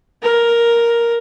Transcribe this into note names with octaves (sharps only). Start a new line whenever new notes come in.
A#4